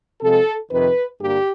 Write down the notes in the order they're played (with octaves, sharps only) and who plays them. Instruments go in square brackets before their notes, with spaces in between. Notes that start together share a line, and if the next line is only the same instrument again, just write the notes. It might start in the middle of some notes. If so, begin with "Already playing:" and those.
[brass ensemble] C3 F3 G#3 A4
F2 C3 D#3 B4
G2 D3 G3 A#3 G4